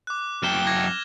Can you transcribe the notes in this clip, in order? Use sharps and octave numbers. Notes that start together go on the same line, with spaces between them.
D6 F#6
F#2 G5 F6 E7 G7
D6 G#6 A#6